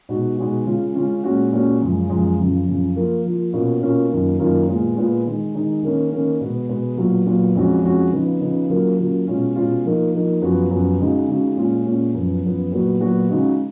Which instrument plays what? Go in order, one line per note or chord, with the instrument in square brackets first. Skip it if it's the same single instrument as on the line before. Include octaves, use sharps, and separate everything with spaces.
[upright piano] B2 G#3 D#4 F#4
B2 G#3 D#4 F#4
C#3 G#3 C#4 F4
C#3 G#3 C#4 F4
A#2 G#3 C#4 F#4
A#2 G#3 C#4 F#4
F#2 C#3 F3 G#3
F#2 C#3 F3 G#3
F#2 C#3 F3
F#2 C#3 F3
F3 A#3 F4
F3 A#3 F4
B2 A#3 C#4 F4
B2 A#3 C#4 F4
F#2 D#3 A#3 F4
F#2 D#3 A#3 F4
A#2 G#3 B3 F4
A#2 G#3 B3 F4
D#3 G#3 D#4
D#3 G#3 D#4
D#3 A#3 C#4
D#3 A#3 C#4
B2 G#3 B3
B2 G#3 B3
A#2 F#3 B3 F4
A#2 F#3 B3 F4
F2 F3 G#3 C#4 F#4
F2 F3 G#3 C#4 F#4
C#3 F3 B3 D#4
C#3 F3 B3 D#4
C#3 F#3 A#3 F4
C#3 F#3 A#3 F4
B2 G#3 C#4 F4
B2 G#3 C#4 F4
F3 A#3 D#4
F3 A#3 D#4
F#2 F3 B3 F#4
F#2 F3 B3 F#4
C#3 G#3 D#4 F#4
C#3 G#3 D#4 F#4
A#2 G#3 C#4 F4
A#2 G#3 C#4 F4
F#2 F3 B3
F#2 F3 B3
A#2 F#3 B3 F#4
A#2 F#3 B3 F#4
C#3 G#3 D#4 F#4